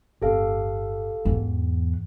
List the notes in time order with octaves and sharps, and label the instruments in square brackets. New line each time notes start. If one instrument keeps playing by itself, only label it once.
[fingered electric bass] G1 A2 C4 [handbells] G4 A4 F5
[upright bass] E2 [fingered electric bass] G#2 E3 G#3